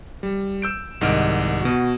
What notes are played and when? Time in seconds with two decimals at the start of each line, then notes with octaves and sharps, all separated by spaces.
0.23 G3
0.62 E6 G6 D7
1.01 C2 G#2 D#3 D#5 F6 D7
1.61 B2 F#4